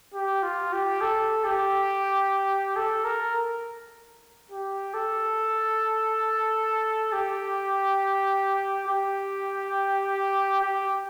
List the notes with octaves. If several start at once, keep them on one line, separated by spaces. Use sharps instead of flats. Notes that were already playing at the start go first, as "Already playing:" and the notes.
G4
F4
G4
A4
G4
A4
A#4
G4
A4
G4
G4
G4